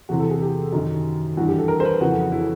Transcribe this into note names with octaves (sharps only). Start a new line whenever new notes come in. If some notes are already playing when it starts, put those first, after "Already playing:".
E2 C3 E3 F#4
A4
G#4
G4
F#2 D#3
G2 E3 F#4
G4
A4
A#4
C5
B4
F2 C#3 E3 F#4
E4